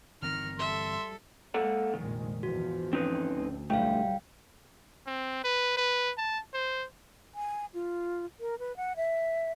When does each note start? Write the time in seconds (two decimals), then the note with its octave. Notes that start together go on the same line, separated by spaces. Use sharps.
0.22 G1 D#3 E3 C4 A#4 F6
0.59 G3 A4 E5 C6
1.54 G#3 A#3 A4 F#5
1.94 F1 A#1 D#3 G#3
2.43 E2 G#2 F3 F#4
2.93 C4 C#4 D#4 B4
3.33 D2
3.70 B1 B2 D3 E3 G3 A3 F5 G5
5.07 C4
5.44 B4
5.77 B4
6.17 A5
6.53 C5
7.35 G#5
7.74 F4
8.40 A#4
8.59 B4
8.77 F#5
8.96 E5